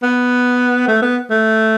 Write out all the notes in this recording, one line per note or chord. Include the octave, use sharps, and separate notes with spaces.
B3
A3
B3
A3